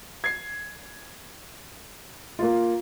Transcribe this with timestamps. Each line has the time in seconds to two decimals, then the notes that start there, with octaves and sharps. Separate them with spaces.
0.24 G#6 C7
2.39 A#3 F4